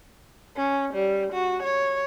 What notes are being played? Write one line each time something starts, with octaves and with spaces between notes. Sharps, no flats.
C#4
G3
F#4
C#5